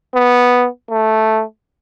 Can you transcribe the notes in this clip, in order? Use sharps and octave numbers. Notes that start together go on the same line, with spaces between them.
B3
A3